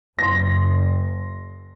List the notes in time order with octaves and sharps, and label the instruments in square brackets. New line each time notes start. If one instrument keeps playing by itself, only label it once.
[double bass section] F#1 [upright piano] C6 A#6